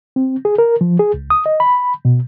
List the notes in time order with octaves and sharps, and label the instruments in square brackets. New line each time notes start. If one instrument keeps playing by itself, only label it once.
[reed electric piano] C4
G#4
A#4
F3
G#4
C#2
D#6
D#5
B5
B2